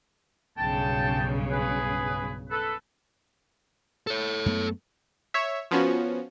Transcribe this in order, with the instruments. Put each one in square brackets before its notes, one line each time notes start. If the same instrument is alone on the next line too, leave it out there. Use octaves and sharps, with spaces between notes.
[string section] B1 G2 C#3 [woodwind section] G5 A5
[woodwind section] G#4 B4
A4 B4
[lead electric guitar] A4 C#5
[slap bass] F#2 A3 B3
[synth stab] C#5 E5
F3 B3 C#4 F#4